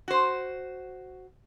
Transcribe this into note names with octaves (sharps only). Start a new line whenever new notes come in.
F#4 C5